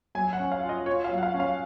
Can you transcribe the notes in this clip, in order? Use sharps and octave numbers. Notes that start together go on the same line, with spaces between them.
F#3 G#5
F#5
C#4
F5
F4
D#5
F4 C#5
F5
F#3
F#5
F5
C#4
F5